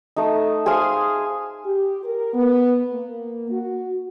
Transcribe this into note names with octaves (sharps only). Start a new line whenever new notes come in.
A3 D#4
G#4 C5 F5 G#5
G4
A#4
B3
A#3
F#4